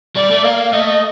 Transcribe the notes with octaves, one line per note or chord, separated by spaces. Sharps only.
G3 D5
A3
A#3 F5
A3 D#5